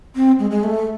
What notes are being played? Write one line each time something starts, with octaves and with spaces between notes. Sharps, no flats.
C4
G#3
G#3
A3